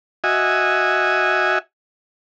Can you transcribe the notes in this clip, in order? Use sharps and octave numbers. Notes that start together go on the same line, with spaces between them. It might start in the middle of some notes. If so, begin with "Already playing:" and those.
F#4 D#5 E5 G#5